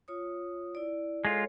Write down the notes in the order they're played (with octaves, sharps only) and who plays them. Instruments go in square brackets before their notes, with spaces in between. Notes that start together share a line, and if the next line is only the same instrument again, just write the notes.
[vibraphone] F4 C#5 D#6
E4 D5
[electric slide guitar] G#3 F4 [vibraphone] A4 C#5